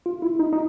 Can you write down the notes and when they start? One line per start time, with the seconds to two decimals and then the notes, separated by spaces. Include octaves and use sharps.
0.06 F4
0.22 E4
0.39 D#4
0.53 D#4